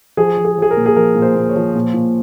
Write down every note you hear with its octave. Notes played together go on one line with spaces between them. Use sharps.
F3 G#4
F3
G#4
F3 G#4
A#4
A#2
G#4
F3 A#4
A#2
C5
A#2
C#5
F3
A#2
A#2